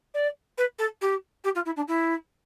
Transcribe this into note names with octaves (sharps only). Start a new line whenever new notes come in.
D5
B4
A4
G4
G4
F4
E4
D4
E4